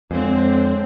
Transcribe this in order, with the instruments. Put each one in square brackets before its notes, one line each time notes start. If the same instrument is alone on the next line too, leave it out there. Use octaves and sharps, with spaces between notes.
[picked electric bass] F2 [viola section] D3 C4 [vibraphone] G#3 C#5